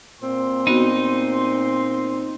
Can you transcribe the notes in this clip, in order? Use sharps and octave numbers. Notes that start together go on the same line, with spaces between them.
A#2 C4 C6
B3 D#4 F#4